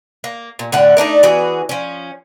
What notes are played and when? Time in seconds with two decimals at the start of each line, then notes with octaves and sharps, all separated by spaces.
0.24 A#3
0.59 A#2
0.72 A2 D3 A3 F#5
0.97 A3 D4 D#4 A#4
1.23 E3 B3 F#4 G#4
1.69 F3 C#4